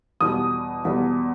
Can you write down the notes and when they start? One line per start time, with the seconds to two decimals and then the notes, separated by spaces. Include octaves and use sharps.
0.21 E2 B2 G3 D#6
0.85 E2 B2 G3